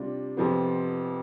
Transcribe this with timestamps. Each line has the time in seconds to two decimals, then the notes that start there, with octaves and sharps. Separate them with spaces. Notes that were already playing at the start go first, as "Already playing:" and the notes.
Already playing: C3 G3 D4 F4
0.37 F2 C3 F3 B3